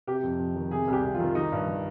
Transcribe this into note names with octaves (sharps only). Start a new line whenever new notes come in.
C3 G4
F2
F2
D#3
C3 G#4
C2 G4
C2
D#3 F4
D#3 D#4
G2
D#3